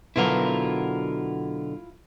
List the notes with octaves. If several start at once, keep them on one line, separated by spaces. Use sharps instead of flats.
B2 D3 F#3 E4 F4 A#4